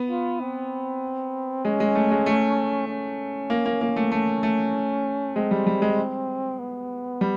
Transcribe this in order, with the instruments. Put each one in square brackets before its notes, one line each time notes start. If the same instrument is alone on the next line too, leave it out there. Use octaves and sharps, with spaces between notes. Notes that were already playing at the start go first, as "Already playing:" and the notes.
Already playing: [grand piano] B3
[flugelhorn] F4
C4
[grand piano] G#3 [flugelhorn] C#4
[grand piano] G#3
A3
G#3
A3
[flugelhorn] C#4
[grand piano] A#3
A#3
A#3
A3
[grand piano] A3 [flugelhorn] C#4
[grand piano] A3
[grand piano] G#3 [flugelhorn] C4
[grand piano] G3
G3
G#3
[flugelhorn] B3
[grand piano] G3